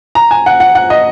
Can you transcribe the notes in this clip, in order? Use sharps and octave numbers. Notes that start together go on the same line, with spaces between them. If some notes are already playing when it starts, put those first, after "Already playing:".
A#5
G#5
F#5
F#5
F#5
D#5